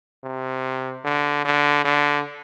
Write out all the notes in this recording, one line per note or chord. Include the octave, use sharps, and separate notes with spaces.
C3
D3
D3
D3